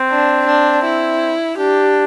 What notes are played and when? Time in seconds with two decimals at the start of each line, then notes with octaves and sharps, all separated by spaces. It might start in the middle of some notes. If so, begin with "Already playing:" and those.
Already playing: C4
0.11 D4
0.48 D4
0.85 E4
1.57 D4 G4